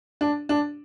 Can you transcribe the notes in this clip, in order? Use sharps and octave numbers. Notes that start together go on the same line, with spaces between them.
D4
D4